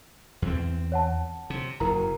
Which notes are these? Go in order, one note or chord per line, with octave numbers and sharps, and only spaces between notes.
E2 C4
C#5 F#5 A5
C3
F#1 E4 A#4 A#5